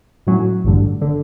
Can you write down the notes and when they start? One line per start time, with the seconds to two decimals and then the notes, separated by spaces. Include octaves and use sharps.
0.27 A2 F#3 C#4
0.64 A1 G2 D3
1.02 D3